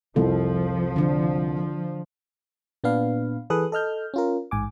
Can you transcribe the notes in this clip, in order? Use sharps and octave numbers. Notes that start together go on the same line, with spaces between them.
C2 F2 F3 A4
D3 D4
A#2 B3 D4 B4 F5
E3 G#4 A4 B4 D#6 F#6
A4 D#5 F6 G6
C#4 F4 A#4
A1 G#2 G#5 D6